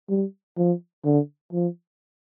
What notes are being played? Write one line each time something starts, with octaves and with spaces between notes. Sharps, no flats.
G3
F3
D3
F3